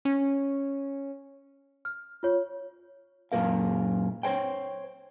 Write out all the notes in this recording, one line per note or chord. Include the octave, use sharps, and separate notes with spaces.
C#4
F6
F4 C#5
F#2 A#2 A#4 F5
C5 C#5 G5